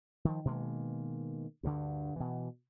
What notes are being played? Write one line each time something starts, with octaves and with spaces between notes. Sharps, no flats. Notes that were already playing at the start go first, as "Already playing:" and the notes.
D#3 F3
B2 D#3 G#3 A#3
D2 G2 D3
B2 E3